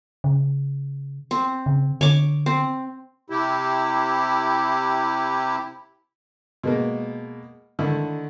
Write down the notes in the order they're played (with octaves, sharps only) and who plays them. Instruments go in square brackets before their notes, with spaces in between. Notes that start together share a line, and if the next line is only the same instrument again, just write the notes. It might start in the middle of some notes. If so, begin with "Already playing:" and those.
[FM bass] C#3
[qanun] C4
[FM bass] C#3
[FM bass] D3 [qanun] C#5 D6
[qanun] C4
[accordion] C3 E4 G4
[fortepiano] B2 G#3 A#3
D3 D#3 A3 E4